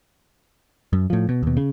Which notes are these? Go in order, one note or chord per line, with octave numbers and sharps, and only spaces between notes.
F#2
A2 F3
B2
D#2 B2
C#3